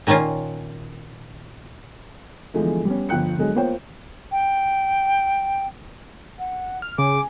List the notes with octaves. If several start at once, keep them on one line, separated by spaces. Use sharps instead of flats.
A#2 D#3 A#3 C#4 F4
E2 D3 E3 F3 G#3 A3
G3 B3 C#4
G1 F3 G5 F#6 C#7
D3 F#3 G#3
A#3 B3 F4 C5 C#5 G5
G5
F#5
F6
C#3 G#5 D6